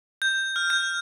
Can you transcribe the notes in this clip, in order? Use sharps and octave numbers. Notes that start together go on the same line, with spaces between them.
G6
F6
G6